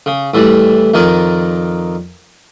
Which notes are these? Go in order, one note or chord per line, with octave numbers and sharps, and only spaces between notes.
C#3
A2 E3 G3 D5
F2 D#3 D#4 A#4 D5 D6